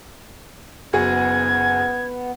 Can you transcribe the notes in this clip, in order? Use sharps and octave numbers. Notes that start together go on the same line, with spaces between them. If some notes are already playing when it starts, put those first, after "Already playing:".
F#1 B3 F#4 G#4 G#6